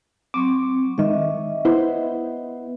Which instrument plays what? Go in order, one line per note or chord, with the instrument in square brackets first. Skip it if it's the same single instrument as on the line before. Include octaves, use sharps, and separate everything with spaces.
[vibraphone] F#3 C4 [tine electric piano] C#6 D6
[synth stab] G#2 D#3 [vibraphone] D#5 E5
[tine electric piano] B3 [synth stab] E4 C5